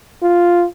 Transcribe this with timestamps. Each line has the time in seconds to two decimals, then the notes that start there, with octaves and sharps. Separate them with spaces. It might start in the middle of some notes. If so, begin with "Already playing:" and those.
0.23 F4